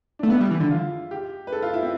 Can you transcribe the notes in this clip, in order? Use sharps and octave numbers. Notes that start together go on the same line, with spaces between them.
A3 D4
B3 E4
G3
E3
D3
F4
G4
B4
A4
F4
E4
C4